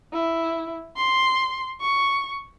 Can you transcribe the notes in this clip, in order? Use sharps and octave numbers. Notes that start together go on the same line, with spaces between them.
E4
C6
C#6